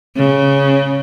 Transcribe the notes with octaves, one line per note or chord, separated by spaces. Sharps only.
C#3